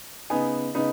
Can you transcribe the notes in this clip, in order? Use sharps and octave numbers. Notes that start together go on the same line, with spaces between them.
C#3 B3 D#4 G#5
C#3 B3 D#4